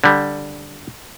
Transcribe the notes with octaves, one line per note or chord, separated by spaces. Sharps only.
D3 G3